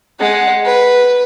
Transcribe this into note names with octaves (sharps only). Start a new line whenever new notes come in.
G#3 F#5
B4